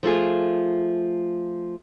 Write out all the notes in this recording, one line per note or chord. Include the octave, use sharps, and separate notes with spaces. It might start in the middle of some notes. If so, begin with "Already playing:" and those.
F3 A3 F4 G#4